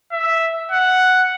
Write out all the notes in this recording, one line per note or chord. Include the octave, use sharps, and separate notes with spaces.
E5
F#5